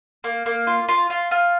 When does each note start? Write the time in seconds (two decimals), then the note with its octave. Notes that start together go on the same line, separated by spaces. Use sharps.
0.24 A#3
0.46 A#3
0.67 F4
0.89 F4
1.10 F4
1.31 F4